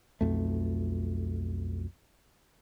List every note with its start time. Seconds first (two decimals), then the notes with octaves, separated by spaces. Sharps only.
0.21 B1 F2 A3